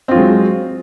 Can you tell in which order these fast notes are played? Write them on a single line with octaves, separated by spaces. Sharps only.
C4 F4 F#3 G#3